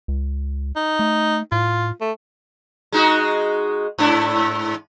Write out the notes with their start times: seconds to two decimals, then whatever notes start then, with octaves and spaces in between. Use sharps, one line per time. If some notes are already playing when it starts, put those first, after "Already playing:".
0.08 C#2
0.76 D#4
0.99 A3
1.52 A2 F4
2.01 A3
2.92 G#3 D#4 F#4
3.98 G#2 D4 E4